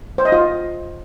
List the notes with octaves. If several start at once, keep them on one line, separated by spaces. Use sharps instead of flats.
C5
D#5
F4